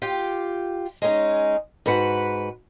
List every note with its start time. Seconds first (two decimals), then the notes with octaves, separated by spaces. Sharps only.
0.02 F4 G4 G5
1.02 G#3 C#4 D#4
1.86 G#2 F#4 B4 F#5